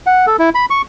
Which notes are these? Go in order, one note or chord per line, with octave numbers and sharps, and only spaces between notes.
F#5
A4
E4
B5
C#6